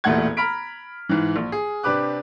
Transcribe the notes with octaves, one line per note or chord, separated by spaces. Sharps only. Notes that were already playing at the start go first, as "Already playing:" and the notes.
E1 A1 A#2 A3 F#5 G#6
A#5 B5 F6 B6 D7
G#2 E3
A#1
G#4
C3 D4 G4 B4 D6 F#6